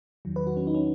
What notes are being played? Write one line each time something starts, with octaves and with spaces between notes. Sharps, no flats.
E2 D#3 F#3
B4
F#4
C#4
D#4
C#4